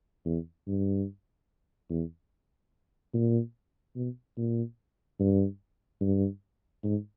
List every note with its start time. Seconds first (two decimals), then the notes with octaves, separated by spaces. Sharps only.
0.25 E2
0.67 G2
1.90 E2
3.14 A#2
3.96 B2
4.37 A#2
5.20 G2
6.01 G2
6.84 G#2